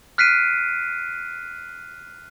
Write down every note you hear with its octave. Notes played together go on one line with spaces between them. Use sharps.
F6 F#6 B6 C7 D7 D#7